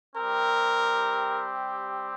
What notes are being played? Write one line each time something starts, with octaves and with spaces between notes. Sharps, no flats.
G3 C4 G4 A#4